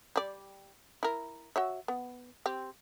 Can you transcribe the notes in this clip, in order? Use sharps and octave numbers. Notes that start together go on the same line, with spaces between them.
G3 D5
E4 A#4
F#4 C#5 E5
B3
C4 G4